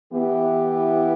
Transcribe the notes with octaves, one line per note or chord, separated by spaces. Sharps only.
E3 B3 E4 G4